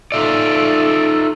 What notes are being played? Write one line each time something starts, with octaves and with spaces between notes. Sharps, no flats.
D#4 F4 A4 D5 E5 E6